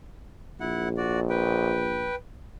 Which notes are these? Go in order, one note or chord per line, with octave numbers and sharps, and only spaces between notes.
A#1 E4 F#5
F#4 D5
B4 G5